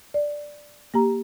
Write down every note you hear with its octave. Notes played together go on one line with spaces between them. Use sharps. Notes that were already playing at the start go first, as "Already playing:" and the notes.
D5
A#3 G4 A#5